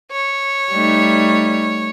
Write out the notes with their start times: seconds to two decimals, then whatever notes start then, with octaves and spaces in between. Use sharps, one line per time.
0.12 C#5
0.72 G3 A3 D#4